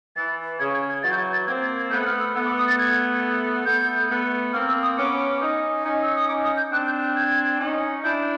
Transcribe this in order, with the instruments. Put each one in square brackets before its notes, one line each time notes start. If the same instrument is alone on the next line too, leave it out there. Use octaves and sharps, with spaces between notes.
[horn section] E3 [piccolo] A6
[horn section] C#3 [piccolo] G#6
[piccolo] G#6
G#6
[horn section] E3 F#3 [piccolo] A6
[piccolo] G6
G#6
A6
[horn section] A#3 C4 [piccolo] G#6
[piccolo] A6
G#6
[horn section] A3 B3 [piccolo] G6
[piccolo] F6
E6
[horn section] A3 B3 [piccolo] E6
[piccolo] D6
D#6
A6
G#6
[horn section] A3 B3 [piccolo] G6
[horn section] A3 B3
[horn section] A#3 C4 [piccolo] F6
[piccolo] E6
D#6
[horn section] B3 C#4 [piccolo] D6
[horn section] C#4 D#4
C#4 D#4
[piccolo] E6
D#6
[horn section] C#4 D#4 [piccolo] D6
[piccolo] D#6
G6
[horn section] C4 D4 [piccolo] F#6
[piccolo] G6
G6
G#6
[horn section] C#4 D#4
[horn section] D4 E4 [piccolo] G6